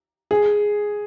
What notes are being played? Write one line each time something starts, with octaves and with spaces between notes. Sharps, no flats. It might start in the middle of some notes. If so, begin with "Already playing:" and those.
G#4